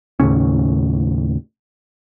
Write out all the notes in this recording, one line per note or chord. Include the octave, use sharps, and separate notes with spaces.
D#2 A2 C#3 C#4